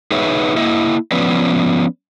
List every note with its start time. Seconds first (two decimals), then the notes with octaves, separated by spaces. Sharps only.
0.11 D#4 G#4 B4 C#5 E5
0.56 A#3 E4 D#5 E5
1.11 F3 B3 C#4 B4 D5